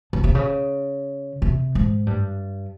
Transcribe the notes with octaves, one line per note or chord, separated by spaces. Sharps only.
C#3
C3
C#3
C3
G#2
G2